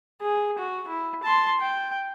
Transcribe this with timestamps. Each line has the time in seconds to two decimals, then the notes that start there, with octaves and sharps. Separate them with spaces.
0.22 G#4
0.58 F#4
0.88 E4
1.23 A5 C6
1.61 G5